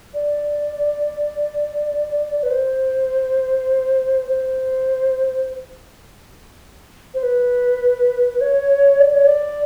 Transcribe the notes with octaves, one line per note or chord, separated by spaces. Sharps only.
D5
B4
C5
C5
C5
B4
C#5
D5
C#5
D5